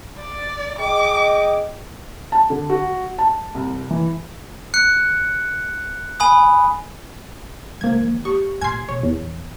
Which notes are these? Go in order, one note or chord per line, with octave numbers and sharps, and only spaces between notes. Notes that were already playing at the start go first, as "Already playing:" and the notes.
D5
G#4 D#5 G5 D6
A5
D3
F#4
A5
C2
E3
F#6 C#7
G#5 B5 D#6
C#3 G#3 A#3 C5 G#6
D#3 F3
A3 G4 C#6
A#2 G#5 C6 G#6 C7
B2 C#5
D1 A#1 E2